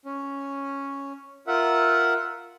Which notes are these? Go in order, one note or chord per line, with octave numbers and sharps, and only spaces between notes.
C#4
F4 A#4 E5 F#5